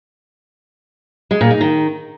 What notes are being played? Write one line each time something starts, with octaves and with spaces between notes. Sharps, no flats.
G#3
A#2
D#4
D#3